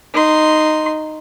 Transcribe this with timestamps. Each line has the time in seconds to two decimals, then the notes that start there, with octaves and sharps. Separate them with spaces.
0.14 D#4 C6